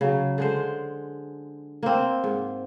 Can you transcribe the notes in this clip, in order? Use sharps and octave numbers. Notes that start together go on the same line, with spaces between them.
C#3 F#3
D3 G#3 C5
A#3 C4
G#2